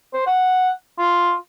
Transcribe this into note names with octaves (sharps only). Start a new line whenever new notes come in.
C5
F#5
F4